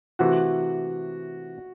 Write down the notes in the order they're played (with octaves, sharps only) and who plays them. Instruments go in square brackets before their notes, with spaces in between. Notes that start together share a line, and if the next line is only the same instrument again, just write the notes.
[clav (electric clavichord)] C3 E3 A3 [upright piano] F#4